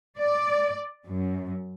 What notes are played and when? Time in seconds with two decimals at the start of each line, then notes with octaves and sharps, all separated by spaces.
0.18 D5
1.06 F#2